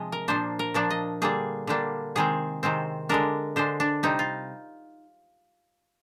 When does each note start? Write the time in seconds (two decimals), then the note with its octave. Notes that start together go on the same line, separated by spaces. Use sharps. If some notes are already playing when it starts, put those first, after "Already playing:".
Already playing: C3 F3 G#3 D#5
0.12 A#4
0.28 A#2 F3 A#3 D4 C5
0.59 A#4
0.74 A#2 F3 A#3 D4 D5
0.90 D#5
1.22 D3 G3 A#3 D4 G#4
1.67 D3 G3 A#3 D4
2.15 C3 D#3 G#3 C4 G#4
2.63 C3 D#3 G#3 C4
3.09 D3 G#3 D4 A#4
3.56 D3 G#3 D4 C5
3.80 D4
4.03 C3 G3 C4 D#4
4.19 F4